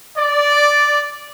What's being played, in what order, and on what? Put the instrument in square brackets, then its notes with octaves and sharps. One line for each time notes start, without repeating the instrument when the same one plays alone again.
[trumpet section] D5